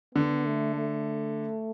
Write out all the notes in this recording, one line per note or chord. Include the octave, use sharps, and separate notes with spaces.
D3 B3
A3
A3